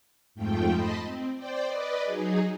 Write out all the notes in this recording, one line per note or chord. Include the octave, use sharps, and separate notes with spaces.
F2 G#2 F3 A3 G5
D#5 A5 B5 C6
C4
C5 D5 G5
B4 D5 D#5
F#3 D#4 G#4